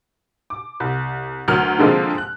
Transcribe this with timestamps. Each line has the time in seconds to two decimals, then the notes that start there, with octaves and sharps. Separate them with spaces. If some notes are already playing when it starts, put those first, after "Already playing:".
0.50 D6
0.80 C2
1.48 D2 F#3 A#4 F6
1.79 D3 F3 G#3 A#3 C4 F4
2.18 F#6